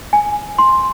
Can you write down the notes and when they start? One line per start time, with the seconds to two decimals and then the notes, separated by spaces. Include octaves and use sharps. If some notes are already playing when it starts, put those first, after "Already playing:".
0.13 G#5
0.58 C6